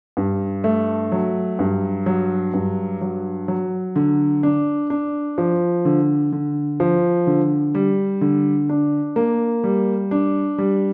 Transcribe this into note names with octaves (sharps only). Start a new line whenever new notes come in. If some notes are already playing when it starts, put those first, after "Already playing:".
G2
A3
F#3
G2
F#3
G2
F#3
F#3
D3
D4
D4
F3
D3
D3
F3
D3
G3
D3
D4
A#3
G3
D4
G3